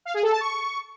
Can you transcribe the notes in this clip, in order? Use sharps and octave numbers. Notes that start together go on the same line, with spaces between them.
F5
G#4
A4
A5
C#6